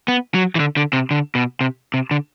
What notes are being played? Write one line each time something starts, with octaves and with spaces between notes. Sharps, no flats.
B3
F#3
E3
D3
D3
C3
D3
B2
C3
C3
D3